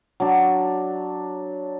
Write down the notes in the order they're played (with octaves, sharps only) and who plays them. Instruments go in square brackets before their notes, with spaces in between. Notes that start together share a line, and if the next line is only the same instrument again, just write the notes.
[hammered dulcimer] F#3 D4